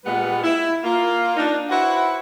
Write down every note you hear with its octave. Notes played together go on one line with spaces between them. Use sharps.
A#2 G3 G#3 B3 B4 F#5
E4
A#3 F4
D4 D#4
E4 F#4 B4 C5 F#5